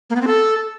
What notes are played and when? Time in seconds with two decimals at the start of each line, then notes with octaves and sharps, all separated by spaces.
0.10 A#3
0.16 B3
0.21 C4
0.27 A4